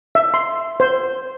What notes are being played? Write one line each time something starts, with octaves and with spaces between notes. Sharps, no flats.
E5
C6
C5